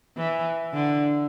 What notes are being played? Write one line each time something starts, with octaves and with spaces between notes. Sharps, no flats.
E3
D3